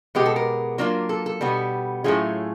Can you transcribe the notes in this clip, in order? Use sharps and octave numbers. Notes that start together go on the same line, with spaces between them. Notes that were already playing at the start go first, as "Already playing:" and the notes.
B2 G#3 B3 G4
A4
A#4
F#3 A#3 D4 F4
A4
A4
B2 G3 B3
A2 F#3 A3 C#4 F4 G#4